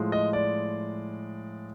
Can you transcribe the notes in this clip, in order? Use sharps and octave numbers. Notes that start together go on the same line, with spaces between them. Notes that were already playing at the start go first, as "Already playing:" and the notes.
Already playing: A2 F3 G#3
D#5
D5